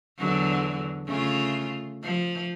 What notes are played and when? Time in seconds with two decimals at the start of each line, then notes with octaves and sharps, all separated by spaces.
0.18 E2 D3 F#3
1.07 C#3 A3 F4
2.03 F3